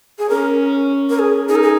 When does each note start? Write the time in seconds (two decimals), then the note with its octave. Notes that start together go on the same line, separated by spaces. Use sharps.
0.18 G#4
0.29 C#4 A#4
1.10 A#4
1.19 G#4
1.49 D#4 G#4
1.56 A#4
1.62 G#4